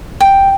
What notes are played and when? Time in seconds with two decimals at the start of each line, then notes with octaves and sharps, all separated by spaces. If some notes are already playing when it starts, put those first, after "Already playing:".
0.20 G5